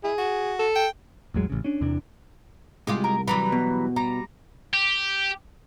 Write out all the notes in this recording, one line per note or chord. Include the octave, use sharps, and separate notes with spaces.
E4 G#4
F#4
A4
G5
A1 E2 F#3 G#3
A1 C#3
C#4 D4
E2 C3 E3 D4
C2 G#3 F4 G4
A#4
E3 F#3 G3 A#5 B5
B2
G3 A#5
G4